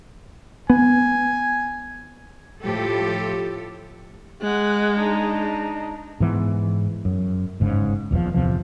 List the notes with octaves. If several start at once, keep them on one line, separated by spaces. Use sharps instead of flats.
B3 G#5
A2 F3 G4 A4
G#3 F#5 F#6
D4 D#4
G#2 E3 B3
F#2
G1 G#2 C#3
D#1 E2 C3 F3
D1 E2 C3 F3